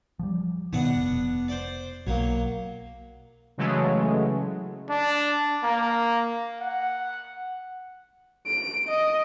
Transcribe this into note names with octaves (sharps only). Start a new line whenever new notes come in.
F3 G3
B2 D#3 B3 D4 F#5
F1
C5 D5
B1 F#3 A#3
C#3 E3 F#3 G#3 A3
D4
A#3
F#5
D7
D#5